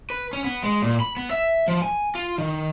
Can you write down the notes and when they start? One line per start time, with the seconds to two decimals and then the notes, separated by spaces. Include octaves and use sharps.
0.10 B4
0.33 C#4
0.44 B3
0.63 G#3
0.82 A#2
1.00 B5
1.17 B3
1.31 E5
1.68 F3
1.82 G#5
2.15 F4
2.38 D#3